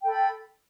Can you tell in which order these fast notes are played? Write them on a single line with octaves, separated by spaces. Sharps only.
G5 A4 B5